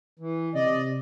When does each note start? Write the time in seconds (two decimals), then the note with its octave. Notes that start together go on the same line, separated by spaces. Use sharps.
0.19 E3
0.55 C3 D5 D#5